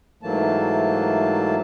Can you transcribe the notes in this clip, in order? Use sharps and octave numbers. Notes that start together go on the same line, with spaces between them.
G#2 E3 F#3 A3 A#3 A5